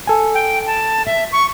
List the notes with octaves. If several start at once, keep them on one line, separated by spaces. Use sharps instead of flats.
A4 G#5
G5
A5
E5
C#6